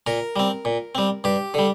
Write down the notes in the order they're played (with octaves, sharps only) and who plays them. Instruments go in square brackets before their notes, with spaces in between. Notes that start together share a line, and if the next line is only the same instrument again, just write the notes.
[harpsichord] A#2 A#4
G3 C4
A#2
G3 C4
G2 G4
D3 G3